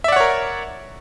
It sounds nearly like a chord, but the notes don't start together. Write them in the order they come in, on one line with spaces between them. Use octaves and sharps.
E5 D5 F#5 C#5 A#4